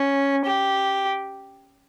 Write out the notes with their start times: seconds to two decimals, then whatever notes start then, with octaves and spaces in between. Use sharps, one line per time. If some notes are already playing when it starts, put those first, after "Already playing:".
Already playing: C#4
0.46 G4